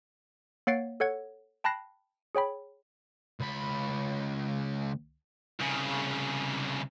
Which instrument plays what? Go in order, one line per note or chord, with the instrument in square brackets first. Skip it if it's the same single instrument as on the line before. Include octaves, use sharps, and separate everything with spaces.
[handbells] A#3 C#5 F#5 A6 C7 D7
A4 C#5 F#5 G#6
G5 A5 B5 F#6 A#6 C7
G#4 C#5 G5 B5
[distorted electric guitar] C#2 B5
C2 C#3